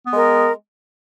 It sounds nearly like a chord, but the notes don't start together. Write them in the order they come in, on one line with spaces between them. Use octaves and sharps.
B3 G#3 A#4